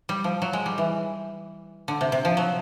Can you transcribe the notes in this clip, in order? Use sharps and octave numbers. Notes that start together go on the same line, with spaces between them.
G3
F3
F#3
G#3
G3
E3
D3
C3
C3
F3
F#3